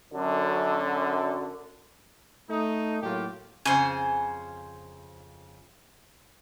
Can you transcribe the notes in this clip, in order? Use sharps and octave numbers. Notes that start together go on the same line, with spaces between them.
F#2 D3
A3 D#4
A2 F#3 A#3 F4 G4
F2 C#3 C5 G#5